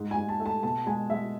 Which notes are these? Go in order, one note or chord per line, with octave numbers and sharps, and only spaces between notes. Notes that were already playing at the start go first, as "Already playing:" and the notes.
Already playing: G#2
G#5
G#2
A5
A3
A5
B2 A5
G#3 G#5
G#3 E5